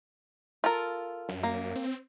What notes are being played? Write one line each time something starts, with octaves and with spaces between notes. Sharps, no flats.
F4 A4 A#4
F#2
A#3
C4